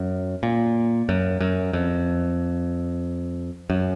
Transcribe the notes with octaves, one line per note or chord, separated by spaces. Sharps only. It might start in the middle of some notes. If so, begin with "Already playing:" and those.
Already playing: F#2
A#2
F#2
F#2
F2
F#2